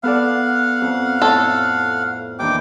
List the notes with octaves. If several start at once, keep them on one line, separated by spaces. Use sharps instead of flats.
B3 A4 D5 F5 F#5
F2
A2 A4 C#5
D#2 E3 D4 G5 D6